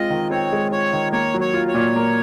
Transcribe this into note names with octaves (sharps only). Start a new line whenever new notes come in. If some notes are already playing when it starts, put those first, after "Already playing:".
Already playing: G#3 C4 F4 D#5
D#3
C4 C#5
G#3
F4 C#5
D#3
A#3 C#5
F#3
C#5
F4
C#5
A#2
A#3